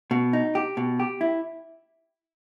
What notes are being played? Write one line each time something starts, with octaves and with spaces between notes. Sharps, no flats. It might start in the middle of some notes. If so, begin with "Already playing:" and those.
B2
D#4
G4
B2
G4
E4